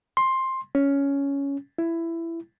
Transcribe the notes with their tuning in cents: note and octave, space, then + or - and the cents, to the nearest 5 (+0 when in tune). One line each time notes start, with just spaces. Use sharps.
C6 +10
C#4 +10
E4 +15